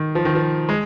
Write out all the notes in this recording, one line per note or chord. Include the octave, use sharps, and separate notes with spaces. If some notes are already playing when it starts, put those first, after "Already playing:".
Already playing: D#3
F3
D#3
F3
G#3